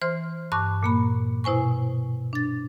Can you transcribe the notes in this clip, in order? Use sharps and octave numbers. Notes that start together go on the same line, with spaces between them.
E3 C5 C6 F6
G2 A5 C#6 D6 F#6
A#2 A#3 B5
B2 E4 C5 G#5 C#6
D4 A6